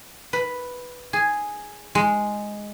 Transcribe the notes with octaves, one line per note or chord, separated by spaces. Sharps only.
B4
G#4
G#3